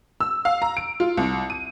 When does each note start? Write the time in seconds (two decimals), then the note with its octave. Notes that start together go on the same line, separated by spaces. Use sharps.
0.20 E6
0.45 F5
0.62 A#5
0.77 D7
1.00 F4
1.17 C2
1.50 D#7